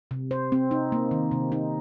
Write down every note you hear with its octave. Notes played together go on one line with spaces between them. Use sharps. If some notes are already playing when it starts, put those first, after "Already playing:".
C3
C5
C4
D#4
A#3
D#3
C3
D#4